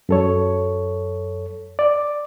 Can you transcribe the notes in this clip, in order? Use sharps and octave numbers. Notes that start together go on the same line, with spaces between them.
F#2 A4 C#5
D5